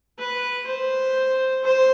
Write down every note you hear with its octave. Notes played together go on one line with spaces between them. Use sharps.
B4
C5
C5